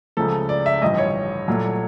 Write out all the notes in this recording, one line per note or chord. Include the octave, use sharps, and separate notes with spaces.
C#2 C#3 F3 A3 A4
D5
E5
A1 G2 D3 F3 D#5
C#5
C2 A#2 F#3 A3